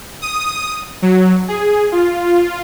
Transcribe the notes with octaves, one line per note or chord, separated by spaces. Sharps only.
D#6
F#3
G#4
F4